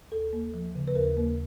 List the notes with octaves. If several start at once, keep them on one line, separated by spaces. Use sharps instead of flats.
D#2 A4
A#3
F3
C#3
B4
D#2 A#4
A#3